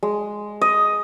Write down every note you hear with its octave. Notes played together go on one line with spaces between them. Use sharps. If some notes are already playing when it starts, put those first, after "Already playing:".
G#3
D#5